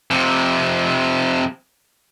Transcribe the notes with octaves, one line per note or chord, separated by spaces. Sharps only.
F2 C3